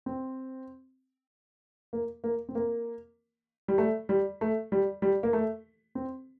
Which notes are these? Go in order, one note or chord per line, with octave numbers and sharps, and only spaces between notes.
C4
A#3
A#3
C4
A#3
G3
A3
G3
A3
G3
G3
A#3
A3
C4